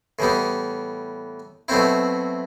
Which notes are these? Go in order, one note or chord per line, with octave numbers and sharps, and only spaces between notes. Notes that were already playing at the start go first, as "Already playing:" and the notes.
A2 E3 G3 B3
B2 F#3 A3 C4 E4